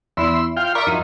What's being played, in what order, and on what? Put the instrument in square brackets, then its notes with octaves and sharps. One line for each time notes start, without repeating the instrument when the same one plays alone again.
[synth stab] E2 E4 [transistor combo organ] B5 C6 E6
[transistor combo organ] F4 F5 G5
[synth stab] A#4 E5 [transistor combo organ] D5 B5 C#6
[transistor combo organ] F#2 F3 [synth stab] D#4